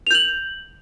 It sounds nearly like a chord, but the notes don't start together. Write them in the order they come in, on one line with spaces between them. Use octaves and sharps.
F7 G6 F#7